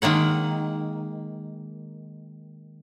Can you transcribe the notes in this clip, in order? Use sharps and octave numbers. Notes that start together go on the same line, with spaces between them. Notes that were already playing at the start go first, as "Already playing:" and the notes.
D#3 G#3 A#3 F#5